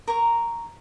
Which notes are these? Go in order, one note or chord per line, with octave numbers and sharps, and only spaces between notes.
A#4 A#5 C#6